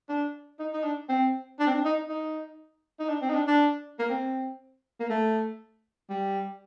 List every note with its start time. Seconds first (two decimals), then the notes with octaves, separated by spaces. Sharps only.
0.09 D4
0.59 D#4
0.74 D#4
0.84 D4
1.09 C4
1.60 D4
1.67 C4
1.75 D4
1.84 D#4
2.09 D#4
2.99 D#4
3.09 D4
3.21 C4
3.29 D#4
3.35 D4
3.47 D4
3.99 A#3
4.09 C4
5.00 A#3
5.10 A3
6.10 G3